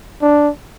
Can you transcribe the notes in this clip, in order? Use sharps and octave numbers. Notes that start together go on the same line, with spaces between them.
D4